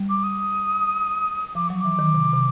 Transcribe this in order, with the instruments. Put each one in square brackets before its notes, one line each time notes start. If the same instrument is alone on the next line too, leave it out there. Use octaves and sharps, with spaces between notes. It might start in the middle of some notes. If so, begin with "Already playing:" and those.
Already playing: [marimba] G3
[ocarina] D6
D#6
[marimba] F3 [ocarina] D6
[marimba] F#3 [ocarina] C#6
[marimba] E3 [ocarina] D6
[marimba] D#3
C3
C3